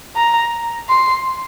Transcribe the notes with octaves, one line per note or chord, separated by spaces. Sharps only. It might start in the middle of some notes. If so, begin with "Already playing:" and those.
A#5
C6